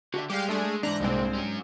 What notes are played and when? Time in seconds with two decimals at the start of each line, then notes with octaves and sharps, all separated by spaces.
0.14 D3 F#4 G4 E5
0.30 G3 G#3 G4 F5
0.49 A3 D4 G#4
0.83 E2 G#2 D4 A#5 F#6
1.00 C2 G2 A#2 G#3 C4
1.35 F#3 C#4